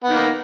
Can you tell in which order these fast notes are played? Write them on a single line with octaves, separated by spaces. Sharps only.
B3 D#3 A#3